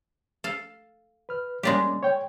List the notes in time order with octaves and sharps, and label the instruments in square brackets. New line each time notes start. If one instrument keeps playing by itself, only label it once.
[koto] A4 F5
[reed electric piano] B4 F6
[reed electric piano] G3 A#3 C#4 [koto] G#3 D4 G4
[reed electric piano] C#5 G5